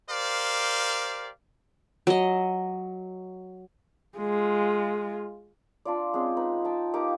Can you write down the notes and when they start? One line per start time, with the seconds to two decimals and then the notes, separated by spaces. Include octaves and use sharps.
0.11 G4 A#4 C5 D5 F5
2.07 F#3 D#5
4.18 G#3 F4
5.85 D4 F4 D5
6.14 G#3 C4 C#4 G#4
6.37 D#4 B4
6.65 G5 A5
6.94 A#3 D#4 G4 D6